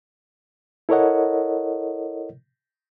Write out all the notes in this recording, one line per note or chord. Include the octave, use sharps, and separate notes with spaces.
E4 A4 A#4 C#5 D#5 F#5